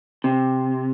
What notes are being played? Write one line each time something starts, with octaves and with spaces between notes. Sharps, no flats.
C3